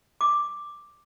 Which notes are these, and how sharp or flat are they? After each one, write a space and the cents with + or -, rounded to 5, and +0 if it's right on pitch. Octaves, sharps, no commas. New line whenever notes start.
D6 +5